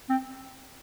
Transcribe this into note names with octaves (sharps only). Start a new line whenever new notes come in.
C4